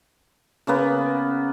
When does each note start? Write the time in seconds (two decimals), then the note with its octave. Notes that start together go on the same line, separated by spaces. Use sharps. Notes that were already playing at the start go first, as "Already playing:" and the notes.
0.67 C#3 A#3 B3